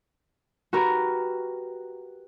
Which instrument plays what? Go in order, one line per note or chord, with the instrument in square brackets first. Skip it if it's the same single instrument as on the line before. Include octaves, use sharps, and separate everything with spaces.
[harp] F#4 G4 A#4 B4